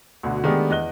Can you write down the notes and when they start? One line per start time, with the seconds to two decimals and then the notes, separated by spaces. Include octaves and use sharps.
0.23 D2 B2 D3
0.44 D#3 G#3 A3 B3 D4 G4
0.70 E2 D#5 F#6 G7